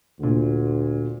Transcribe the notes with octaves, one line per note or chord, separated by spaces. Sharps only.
D2 A#2 D3